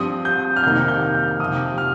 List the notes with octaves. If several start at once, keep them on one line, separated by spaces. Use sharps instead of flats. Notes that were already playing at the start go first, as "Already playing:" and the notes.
Already playing: G2 F3 C4 D#6
G6
F6
F2 C3 D#3 A#3 D#4 G6
G6
F6
F2 C3 F3 D#6
F6